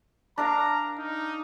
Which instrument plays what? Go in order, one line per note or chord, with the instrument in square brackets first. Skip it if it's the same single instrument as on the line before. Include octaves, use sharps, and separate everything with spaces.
[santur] D4 A#4 F5 [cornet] A#5
[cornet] D#4